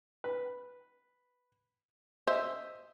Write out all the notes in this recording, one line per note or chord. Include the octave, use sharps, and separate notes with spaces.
B4
C5 D#5 E5